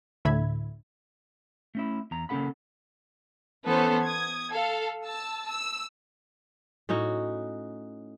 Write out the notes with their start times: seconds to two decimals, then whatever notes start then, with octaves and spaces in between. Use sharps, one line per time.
0.25 D2 A2 D3 E5 B5 G#6
1.75 A3 C#4 E4
2.11 E2 A#5
2.29 C#3 A#3 C#4 A4 F#5 B5
3.66 E3 B3 C#4 A4 C5
4.05 D#6 G#6
4.49 A4 F5
5.06 A5 E6
5.48 E6
6.89 A2 C#4 D#4 F#4